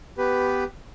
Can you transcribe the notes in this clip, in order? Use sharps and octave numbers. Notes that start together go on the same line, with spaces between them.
B3 G4 B4